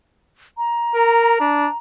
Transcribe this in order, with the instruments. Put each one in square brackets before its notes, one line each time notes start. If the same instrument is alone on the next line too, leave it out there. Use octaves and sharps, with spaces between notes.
[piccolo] A#5
[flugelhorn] A#4
D4